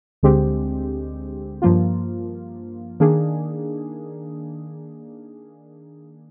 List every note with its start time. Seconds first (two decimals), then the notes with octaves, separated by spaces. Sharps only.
0.23 D2 D3 G#3 C4 G4
1.62 G2 F3 A#3 F4
3.00 D#3 A#3 D4 G#4